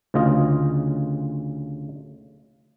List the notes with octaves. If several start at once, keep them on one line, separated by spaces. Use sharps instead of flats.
D2 C#3 F4 D#5